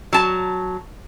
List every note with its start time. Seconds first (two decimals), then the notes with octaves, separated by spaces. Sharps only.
0.13 F#3 A5